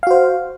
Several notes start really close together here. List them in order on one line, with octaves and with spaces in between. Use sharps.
F5 F#4 C5